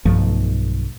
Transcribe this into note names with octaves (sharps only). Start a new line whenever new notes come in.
B1 G2 F3 A3